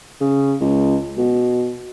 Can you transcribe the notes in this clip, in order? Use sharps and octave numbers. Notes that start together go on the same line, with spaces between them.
C#3
C#2
B2